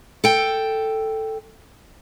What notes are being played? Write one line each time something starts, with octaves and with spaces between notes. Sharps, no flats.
A4 G5